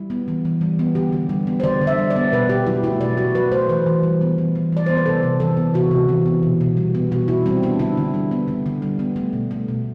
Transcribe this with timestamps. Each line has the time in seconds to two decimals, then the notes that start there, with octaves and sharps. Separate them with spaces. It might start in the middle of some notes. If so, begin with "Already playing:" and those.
Already playing: G3 E4
0.10 B3
0.28 E3
0.45 E3
0.61 G3
0.79 B3
0.95 D3 G4
1.13 D3
1.29 G3
1.47 B3
1.60 C5
1.64 D3 D5
1.81 D3
1.87 E5
1.98 G3
2.10 D5
2.16 B3
2.32 B2 B4
2.49 B2 G4
2.66 F#3 E4
2.83 A3 E4
3.01 B2 D5
3.17 B2 F#4
3.35 F#3 B4
3.52 A3 C5
3.69 E3 B4
3.86 E3
4.03 G3
4.21 B3
4.38 E3
4.55 E3
4.73 G3 D5
4.86 B3 C5
4.97 B4
5.06 C3 A4
5.23 C3
5.40 E3 A4
5.57 B3
5.74 C3 F#4
5.91 C3
6.09 E3
6.26 B3
6.43 B2
6.61 B2
6.77 G3
6.95 B3
7.11 B2 F#4
7.28 B2 E4
7.46 G3 C4
7.63 B3 D4
7.79 D3 E4
7.97 D3
8.14 G3
8.31 B3
8.48 D3
8.66 D3
8.82 G3
8.99 B3
9.16 A3
9.33 B2
9.51 A3
9.68 B2